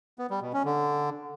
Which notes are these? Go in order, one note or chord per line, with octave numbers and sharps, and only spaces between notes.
B3
G3
B2
C#4
D3